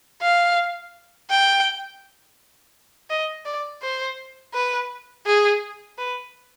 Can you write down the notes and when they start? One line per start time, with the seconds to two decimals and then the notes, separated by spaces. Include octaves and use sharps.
0.22 F5
1.30 G5
3.10 D#5
3.46 D5
3.83 C5
4.54 B4
5.26 G#4
5.98 B4